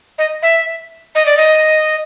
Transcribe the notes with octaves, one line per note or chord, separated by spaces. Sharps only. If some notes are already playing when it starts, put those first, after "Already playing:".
D#5
E5
D#5
D5
D#5